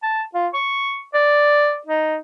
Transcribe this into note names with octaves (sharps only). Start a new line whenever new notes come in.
A5
F4
C#6
D5
D#4